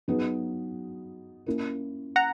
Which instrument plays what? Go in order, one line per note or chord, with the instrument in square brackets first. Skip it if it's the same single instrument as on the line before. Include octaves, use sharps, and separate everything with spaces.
[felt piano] F#3 B3 D#4 G#4
A#3 C#4 E4 A#4
[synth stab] F#5 A#5